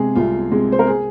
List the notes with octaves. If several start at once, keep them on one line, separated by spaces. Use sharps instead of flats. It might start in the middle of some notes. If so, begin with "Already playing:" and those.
Already playing: C3 G#3 G#4
C2 F4
C3 G#3
C5
A#4
G#4